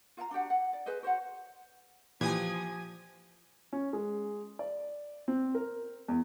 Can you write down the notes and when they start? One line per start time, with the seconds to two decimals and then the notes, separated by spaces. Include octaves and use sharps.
0.17 F4 F5 G5 A#5
0.31 D4 F#4 G4 F#5
0.50 F#5
0.73 D5
0.86 G#4 B4 C5 D#5
1.03 F#4 C5 C#5 F#5
2.21 A#2 E3 F3 G4 G#5 D#6 G#6
3.73 C#4
3.93 G#3
4.59 D5
5.28 C4
5.55 A#4
6.08 E2